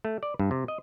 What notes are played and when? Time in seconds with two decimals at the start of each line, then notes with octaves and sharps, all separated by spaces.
0.05 A3
0.23 D5
0.40 G2
0.51 C3
0.68 D#5